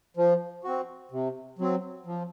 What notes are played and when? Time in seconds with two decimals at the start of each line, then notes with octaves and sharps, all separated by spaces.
0.17 F3
0.64 C4 F#4
1.12 C3
1.59 F#3 C4
2.06 F3